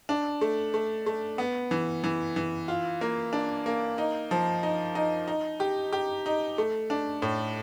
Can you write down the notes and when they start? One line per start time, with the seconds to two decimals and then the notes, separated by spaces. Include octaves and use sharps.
0.09 D4
0.41 A3
0.74 A3
1.06 A3
1.38 B3
1.71 E3
2.04 E3
2.36 E3
2.68 F4
3.01 A#3
3.33 D4
3.66 A#3
3.98 D#4
4.31 F3
4.63 D#4
4.95 D#4
5.28 D#4
5.60 G4
5.93 G4
6.26 D#4
6.58 A3
6.90 D4
7.22 A2